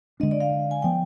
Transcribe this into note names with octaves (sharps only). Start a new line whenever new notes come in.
D3 G#3 B3 D4 D#5
D5
F5
G#5
F3 B3 G5